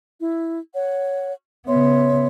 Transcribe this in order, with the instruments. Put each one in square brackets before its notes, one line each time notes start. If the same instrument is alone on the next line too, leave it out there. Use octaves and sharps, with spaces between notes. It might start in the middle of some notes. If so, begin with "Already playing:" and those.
[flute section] E4
C#5 F#5
[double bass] C#3 B3 [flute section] C#5 E5 C6